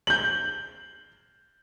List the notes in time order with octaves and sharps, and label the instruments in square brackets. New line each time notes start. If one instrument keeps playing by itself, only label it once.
[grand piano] G6 F#7